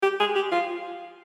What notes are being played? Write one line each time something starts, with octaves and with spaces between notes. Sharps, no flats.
G4
G#4
G4
F4